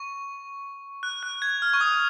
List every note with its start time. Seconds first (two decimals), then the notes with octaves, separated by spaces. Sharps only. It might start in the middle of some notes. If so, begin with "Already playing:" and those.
Already playing: C#6
1.03 F#6
1.23 F#6
1.42 G#6
1.62 F6
1.73 C#6
1.81 D#6